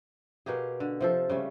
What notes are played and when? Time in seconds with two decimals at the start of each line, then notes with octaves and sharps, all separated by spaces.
0.46 B2 A#3 G4 G#4
0.80 D3
1.01 C3 F3 A4
1.29 C#3 G3 A3